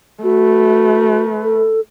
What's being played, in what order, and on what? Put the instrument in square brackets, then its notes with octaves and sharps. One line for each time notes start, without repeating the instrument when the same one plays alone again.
[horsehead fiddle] A3 B4 [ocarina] F#4
[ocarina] A4